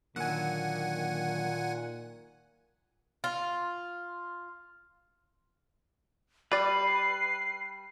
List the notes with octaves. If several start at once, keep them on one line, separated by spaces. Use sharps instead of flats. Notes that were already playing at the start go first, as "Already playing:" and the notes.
A#2 D3 D#3 F#3 A#3 F#5 G#5
F4
G3 B4 D5 C7